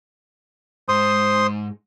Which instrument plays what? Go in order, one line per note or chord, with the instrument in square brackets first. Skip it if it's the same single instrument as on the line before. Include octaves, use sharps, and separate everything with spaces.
[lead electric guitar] G#2 [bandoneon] C5 C6 D#6